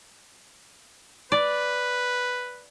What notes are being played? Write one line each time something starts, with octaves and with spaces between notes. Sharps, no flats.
B4 D5